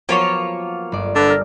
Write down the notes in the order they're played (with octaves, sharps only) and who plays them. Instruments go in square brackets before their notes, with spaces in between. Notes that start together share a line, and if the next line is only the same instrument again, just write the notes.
[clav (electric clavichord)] F3 F#3 B3 [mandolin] A#3 F4 C#5
[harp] G1 D5
[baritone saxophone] D3 [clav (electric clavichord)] A4 B4
[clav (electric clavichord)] A4 A#4